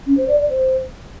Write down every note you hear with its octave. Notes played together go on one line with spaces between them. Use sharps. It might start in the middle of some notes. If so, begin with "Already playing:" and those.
C#4
C5
D5
D5
C5